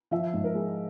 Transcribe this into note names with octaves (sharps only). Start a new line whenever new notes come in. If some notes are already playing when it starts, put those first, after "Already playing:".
F3 E5
G#2
A#4
G#3